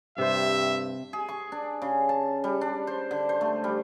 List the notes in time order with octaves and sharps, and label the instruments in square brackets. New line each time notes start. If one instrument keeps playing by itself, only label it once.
[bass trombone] G2 [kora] C3 C5 [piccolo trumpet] E5
[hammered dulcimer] G#4
C#6
D4
C#3
A5
G3
D4
C5
D3
C5
A3
G3